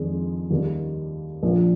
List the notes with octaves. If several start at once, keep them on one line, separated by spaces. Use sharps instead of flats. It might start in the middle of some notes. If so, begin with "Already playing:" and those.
Already playing: F2 D#3 G#3 D4
D#2 D#3 G3
A#1 A#2 F3 A#3